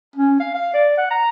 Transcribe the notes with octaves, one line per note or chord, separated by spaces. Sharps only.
C#4
F5
F5
D5
F#5
A#5